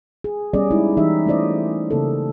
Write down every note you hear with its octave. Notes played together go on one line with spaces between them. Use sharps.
G#4
G3 B3 C#4 G#4 D5 D#5
G#3 D#4 E4
E3 D#4 G4 E5
A3 C#4 F4 C5 D5 D#5
C#3 A#3 A4